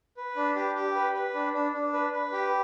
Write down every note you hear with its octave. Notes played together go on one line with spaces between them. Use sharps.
B4
D4
G4
G4
B4
B4
D4
D4
D4
B4
B4
G4